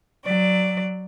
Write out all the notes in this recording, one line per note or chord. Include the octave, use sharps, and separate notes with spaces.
F#3 D5